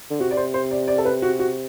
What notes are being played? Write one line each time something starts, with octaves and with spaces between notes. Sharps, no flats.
D3
C3 F#4
D5
C5
C5
D5
D5
A4
B4
F#4
F#4